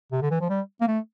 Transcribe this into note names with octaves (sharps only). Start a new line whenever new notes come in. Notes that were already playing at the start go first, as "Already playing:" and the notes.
C3
D3
E3
F3
G3
A#3
A3